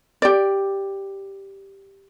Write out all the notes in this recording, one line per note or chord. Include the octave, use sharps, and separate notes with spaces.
G4 D5